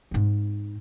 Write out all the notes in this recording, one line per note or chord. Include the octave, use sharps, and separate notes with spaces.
G#2 C4